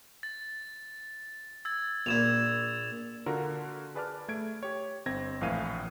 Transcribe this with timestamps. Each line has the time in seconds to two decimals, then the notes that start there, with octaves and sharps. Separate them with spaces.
0.23 A6
1.65 E6 G#6 A6
2.06 A#1 A#2 G#6 E7 F7
3.26 D3 F4 F#4 A#4
3.95 G#4 B4 D5 A5 D6 F6
4.28 A3 G#6 D7
4.63 G4 C#5
5.06 G1 C4 G#6 A#6
5.41 A#1 A2 E3 F5 D#7